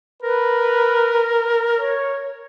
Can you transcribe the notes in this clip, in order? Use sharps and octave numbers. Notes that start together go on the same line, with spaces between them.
A#4 B4
C#5